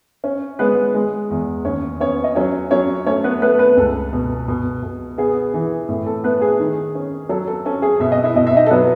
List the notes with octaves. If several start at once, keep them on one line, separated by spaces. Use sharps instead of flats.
C#4 C#5
G#3 B3 B4
G#3
E2
D#2 C#4 C#5
B3 C#4 C#5
D#5
F#3 C#4 C#5
F#3 C#4 C#5
A3 C#4 C#5
B3 B4
A3 B3 B4
B3 B4
C#2 A4
B2
B2
B2
B3 G#4
E3
A2
A4
A3 B3 B4
G#4
D#3
C#4
F#3 A4
A4
C#4 A4
G#4
B2 E5
D#5
E4 E5
B2 D#5
E5
D#4 D#5
A4
F#3 B3 B4